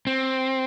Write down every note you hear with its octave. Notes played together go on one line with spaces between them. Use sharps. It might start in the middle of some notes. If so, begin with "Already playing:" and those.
C4